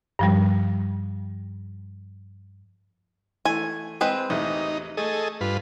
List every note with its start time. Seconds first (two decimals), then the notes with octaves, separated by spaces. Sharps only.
0.19 G2 F3 G3
3.45 E3 A3 G#5
4.01 G#3 C4 B4
4.30 A1 E2 D#4
4.97 A3 G#4 A4 D#5
5.41 G2 F4 B4